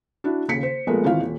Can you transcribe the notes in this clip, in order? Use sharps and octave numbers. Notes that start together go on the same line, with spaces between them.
D4 E4 F#4
D#1 D#2 C#3 B6 C#7
C5
A#1 G#3 A3 B3 A#4
G#1 E3 F4 F5
D#1